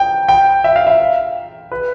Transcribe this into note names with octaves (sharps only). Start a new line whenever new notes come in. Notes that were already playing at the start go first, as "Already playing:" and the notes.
Already playing: G5
G5
E5
F5
E5
B4